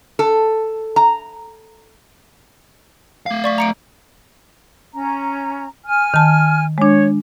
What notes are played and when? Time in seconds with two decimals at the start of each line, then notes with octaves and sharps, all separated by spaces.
0.19 A4
0.96 A#5
3.26 A3 F5
3.44 D5 C#6 B6
3.58 A#5 C#7 D7
4.94 C#4 A#5
5.85 G#5 F6
6.14 D#3 A5
6.78 G#3 D4 C#5